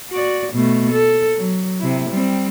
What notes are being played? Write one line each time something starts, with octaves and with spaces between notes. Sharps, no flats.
F#4 D5
B2 A3
A4
F#3
C3 E4
G3 C4